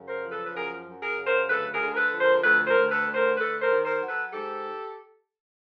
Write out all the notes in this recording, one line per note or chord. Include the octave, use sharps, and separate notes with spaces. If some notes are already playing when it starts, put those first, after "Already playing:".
Already playing: F#2 C#3
A#4 C5
F3
A4 B4
B4
F#2 G#4 A#4
F#2
G#4 A#4
C#3
A#4 C5
D2 A4 B4
G#4 A#4
D3
A#4
A4 B4
F3
A#4 C5
D2 A4 B4
A#4 C5
D2
A4 B4
D3
A#4 C5
A3 A4 B4
A#4 C5
D#3
A#4 C5
F#3
A4 B4
G#2 G4 A4